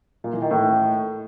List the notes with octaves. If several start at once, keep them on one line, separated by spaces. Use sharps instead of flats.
A#2
E3
D#3
A2